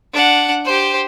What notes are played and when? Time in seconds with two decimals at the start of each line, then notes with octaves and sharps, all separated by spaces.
0.13 D4 F#5
0.65 G4 C5